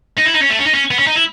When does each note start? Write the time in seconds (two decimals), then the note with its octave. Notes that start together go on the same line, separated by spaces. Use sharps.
0.18 D#4
0.26 E4
0.34 D#4
0.42 C#4
0.50 A3
0.59 C#4
0.66 D#4
0.75 C#4
0.91 B3
0.99 C#4
1.07 D#4
1.16 E4